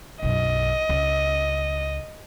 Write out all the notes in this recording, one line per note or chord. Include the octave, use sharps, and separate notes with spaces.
B1 F#2 D#5
C#2